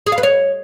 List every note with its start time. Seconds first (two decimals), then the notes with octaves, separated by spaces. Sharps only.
0.06 G#4
0.12 F5
0.18 B4
0.23 C#5